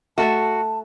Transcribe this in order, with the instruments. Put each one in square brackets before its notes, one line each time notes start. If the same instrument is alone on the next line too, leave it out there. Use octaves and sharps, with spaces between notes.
[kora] A3 A4 E5 [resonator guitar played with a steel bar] F#4 [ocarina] A5